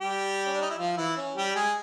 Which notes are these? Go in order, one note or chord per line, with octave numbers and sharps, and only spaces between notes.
G3 G4
C#4
D4
D#4
E4
F3 F4
E3 E4
C#4
G3 G4
G#3 G#4